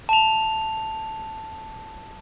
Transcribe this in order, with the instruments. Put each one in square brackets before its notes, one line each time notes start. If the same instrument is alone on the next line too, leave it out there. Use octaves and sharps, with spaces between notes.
[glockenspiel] A5 F7